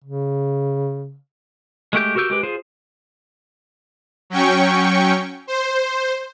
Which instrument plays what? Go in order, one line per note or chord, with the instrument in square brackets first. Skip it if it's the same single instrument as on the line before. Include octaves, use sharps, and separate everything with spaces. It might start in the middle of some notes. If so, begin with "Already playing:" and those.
[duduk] C#3
[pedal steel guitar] G#3 A3 G4 G6
F#4 G4 A#4 E6 G6
G#3 G4 B4
F4 G#4 C5
[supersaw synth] F#3 C#4 G5 C#6
C5